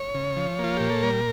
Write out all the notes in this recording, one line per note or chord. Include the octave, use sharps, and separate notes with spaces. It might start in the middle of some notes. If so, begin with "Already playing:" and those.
Already playing: C#5
C#3
F3
A#3 F4
A#2 G4
A4
G3 A#4